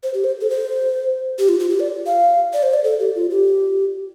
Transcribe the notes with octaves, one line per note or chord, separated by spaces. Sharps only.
C5
G4
C5
A4
C5
G4
F4
F4
G4
D5
F5
D5
C5
D5
A4
G4
F4
G4